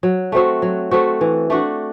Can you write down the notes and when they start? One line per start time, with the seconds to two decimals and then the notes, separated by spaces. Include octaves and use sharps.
0.03 F#3
0.32 A3 C4 F#4
0.62 F#3
0.91 A3 C4 F#4
1.21 E3
1.50 A3 D4 F#4